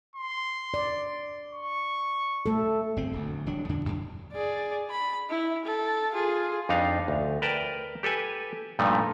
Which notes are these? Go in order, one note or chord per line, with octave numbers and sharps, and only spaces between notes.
C6
D5
C#6
A3 A4
G1 C#3 C4
D1 D2
D#1 F#3 D4
E2 D3 D4
D1 F#2
G#4 D5
B5
E4
A4
F4 G#4
F2 D4 D#4 F5
D2
A#4 B4 D5 G5 A5
G4 A4 B4 G#5
G2 A#2 F3 A3 D#4